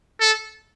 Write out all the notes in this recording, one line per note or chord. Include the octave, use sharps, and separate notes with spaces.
A4